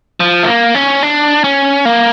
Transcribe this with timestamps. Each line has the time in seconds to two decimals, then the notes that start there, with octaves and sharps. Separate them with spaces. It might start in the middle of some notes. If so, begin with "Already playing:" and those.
0.20 F3
0.43 A3
0.47 A#3
0.75 C#4
1.03 D4
1.44 C#4
1.85 A#3